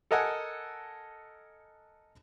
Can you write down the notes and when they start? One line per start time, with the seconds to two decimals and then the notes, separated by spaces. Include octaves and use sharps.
0.11 A4 A#4 D#5 F#5 G#5